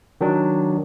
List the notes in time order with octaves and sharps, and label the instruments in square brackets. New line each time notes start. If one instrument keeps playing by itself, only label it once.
[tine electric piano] D#3 F#3 D4